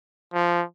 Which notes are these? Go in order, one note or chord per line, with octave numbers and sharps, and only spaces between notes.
F3